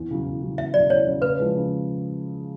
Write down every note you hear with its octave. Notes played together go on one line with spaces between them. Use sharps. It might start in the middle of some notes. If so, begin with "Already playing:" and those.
Already playing: E2
C#3 F#3
E2
C#3 F#3
E2 E5
C#3 F#3 D5
E2 C#5
C#3 F#3
C#3 B4
F3 G#3
C#3